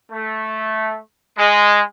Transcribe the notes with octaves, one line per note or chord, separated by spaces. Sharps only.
A3
G#3